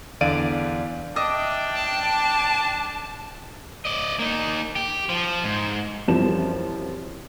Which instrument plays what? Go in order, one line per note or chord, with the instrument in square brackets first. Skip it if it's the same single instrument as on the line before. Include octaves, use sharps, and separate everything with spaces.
[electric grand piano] E2 D3 D5 F5 D7 D#7
[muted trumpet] D4 [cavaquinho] D#5 E5 D6 [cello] G5
[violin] A5
[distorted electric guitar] D5 D#5
A#3 D#4
G4
F3
G#2
[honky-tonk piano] F#2 E3 F3 G3 C4 E7